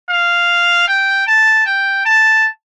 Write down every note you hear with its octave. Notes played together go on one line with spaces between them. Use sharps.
F5
G5
A5
G5
A5